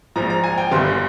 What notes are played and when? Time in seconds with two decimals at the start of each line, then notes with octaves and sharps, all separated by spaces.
0.16 A#1 G#2 F3 A#5
0.30 A#5
0.44 G#5
0.58 G5
0.71 G1 G2 D3 C6